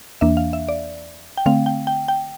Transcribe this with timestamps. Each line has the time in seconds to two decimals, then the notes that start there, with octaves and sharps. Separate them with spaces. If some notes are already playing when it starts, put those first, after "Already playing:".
0.21 E2 E3 A#3 D4 E5
0.37 F5
0.53 E5
0.68 D5
1.37 G5
1.46 D3 A3 C4 F5
1.66 G5
1.87 G5
2.08 G5